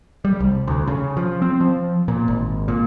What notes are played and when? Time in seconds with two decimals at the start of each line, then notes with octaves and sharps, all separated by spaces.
0.25 G3
0.40 C2
0.67 D2
0.87 C#3
1.17 F3
1.42 C4
1.60 F3
2.08 A#2
2.28 G#1
2.68 A#2